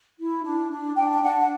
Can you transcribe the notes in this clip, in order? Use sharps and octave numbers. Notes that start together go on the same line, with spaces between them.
E4
D4
D4
D4 G5
G5
D4 F#5
F#5